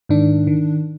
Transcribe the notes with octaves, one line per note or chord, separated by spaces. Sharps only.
G#2 D#3 D4
D#3